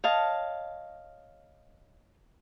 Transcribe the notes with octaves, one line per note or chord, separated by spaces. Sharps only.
C#5 D#5 F5 A5